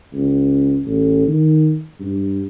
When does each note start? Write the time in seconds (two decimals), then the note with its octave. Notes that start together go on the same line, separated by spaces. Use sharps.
0.13 C#2
0.85 A1
1.27 D#3
2.00 G2